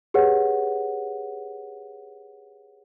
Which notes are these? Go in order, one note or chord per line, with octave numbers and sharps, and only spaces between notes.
G4 G#4 B4 C#5 F#5